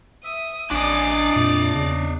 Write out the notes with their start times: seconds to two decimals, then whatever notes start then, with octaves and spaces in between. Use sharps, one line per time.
0.24 E5 D#6
0.71 A1 D4 D5 D#5 G#5 A6
1.36 F2 A#2
1.75 E2 C#3